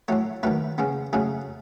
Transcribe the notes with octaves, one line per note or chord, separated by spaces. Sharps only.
A2 F#3 A3 C#5
D#3 F#3 A3 B4
C#3 G#3 B3
C#3 F#3 A3 G#4